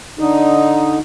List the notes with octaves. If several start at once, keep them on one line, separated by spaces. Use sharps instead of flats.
D3 D#4